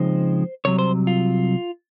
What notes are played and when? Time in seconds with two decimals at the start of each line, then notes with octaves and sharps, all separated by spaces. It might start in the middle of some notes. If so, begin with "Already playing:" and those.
Already playing: C#3 F3 G#3 C4 D#4 C5
0.65 C2 C3 F#3 C#5
0.79 C5
1.07 F4